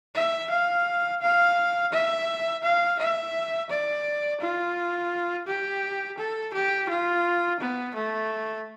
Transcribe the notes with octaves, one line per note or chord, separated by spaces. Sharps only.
E5
F5
F5
E5
F5
E5
D5
F4
G4
A4
G4
F4
B3
A3